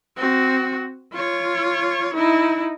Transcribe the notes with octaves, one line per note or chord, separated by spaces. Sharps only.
C4 F#4
F4 C#5
D#4 E4